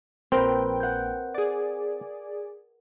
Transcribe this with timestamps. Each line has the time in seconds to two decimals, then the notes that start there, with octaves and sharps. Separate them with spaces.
0.32 A#1 C4 A#4 B4 G5
0.80 F#5 G6
1.34 G#4 D5